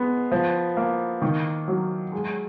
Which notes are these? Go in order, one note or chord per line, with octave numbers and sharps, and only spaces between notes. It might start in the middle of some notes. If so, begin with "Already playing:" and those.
Already playing: G#3 B3
F3
A#3
D#3
F#3
G#3